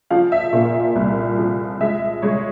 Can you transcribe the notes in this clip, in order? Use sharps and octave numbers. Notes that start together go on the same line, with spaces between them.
F3 F5
E5
A#2 F5
E5
C2
F3
G#3 E5
G#3 C#5